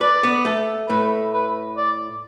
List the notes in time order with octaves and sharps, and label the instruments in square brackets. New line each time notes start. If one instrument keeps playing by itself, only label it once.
[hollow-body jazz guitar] B4 [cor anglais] D5
[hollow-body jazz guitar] B3 B4
A3 A4
[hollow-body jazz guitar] A2 A3 [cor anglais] B4
[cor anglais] B4
D5